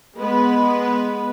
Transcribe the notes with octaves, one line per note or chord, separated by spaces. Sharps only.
G#3 B3 B4